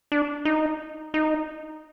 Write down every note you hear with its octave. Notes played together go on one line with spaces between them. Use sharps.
D4
D#4
D#4